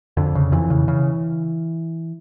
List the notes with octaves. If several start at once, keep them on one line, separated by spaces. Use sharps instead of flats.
F2 D3
C#3
F2 E3
C#3
C#3